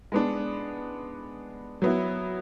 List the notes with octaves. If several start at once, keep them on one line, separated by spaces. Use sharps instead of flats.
G#3 B3 D4
F#3 B3 E4